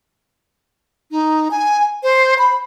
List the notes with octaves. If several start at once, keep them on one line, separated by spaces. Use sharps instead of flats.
D#4
G#5
C5
B5